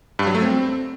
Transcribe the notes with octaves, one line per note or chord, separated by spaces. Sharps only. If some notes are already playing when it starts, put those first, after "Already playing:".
G2
F#3
A3
C4